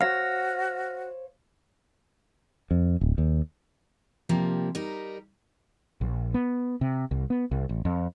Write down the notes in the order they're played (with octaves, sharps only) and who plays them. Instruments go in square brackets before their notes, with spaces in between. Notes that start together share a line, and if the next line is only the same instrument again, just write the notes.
[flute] F#4 [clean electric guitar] C5 C#5 F5 [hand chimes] F6 A#6
[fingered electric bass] F2
D1
D#2
[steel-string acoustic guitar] C3 F3 G3 A#3
G3 D#4 A#4
[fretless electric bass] A#1
B3
C3
C2
B3
C2
A1
F2